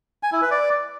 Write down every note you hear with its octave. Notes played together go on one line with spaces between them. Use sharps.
G#5
E4
B4
D5